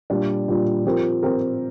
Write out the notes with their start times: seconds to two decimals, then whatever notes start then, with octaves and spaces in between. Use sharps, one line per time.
0.10 A#2 G3 D4 F4
0.48 A#2 G3 D4 F4
0.85 F3 C4 G4 A#4
1.22 F3 C4 G4 A#4